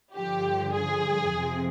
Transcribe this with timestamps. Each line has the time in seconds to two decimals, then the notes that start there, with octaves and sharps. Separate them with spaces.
0.14 G2 D3 F3 G4
0.73 G#4
1.32 F2 C3 F3